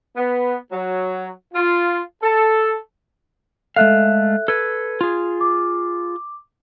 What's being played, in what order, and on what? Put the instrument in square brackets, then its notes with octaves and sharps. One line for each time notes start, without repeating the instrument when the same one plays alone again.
[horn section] B3
F#3
F4
A4
[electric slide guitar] G#3 A3 F5 [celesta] A4 E5 F#6
[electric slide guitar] A4 B4 [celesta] G#6
[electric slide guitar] F4 G#4
[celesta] D6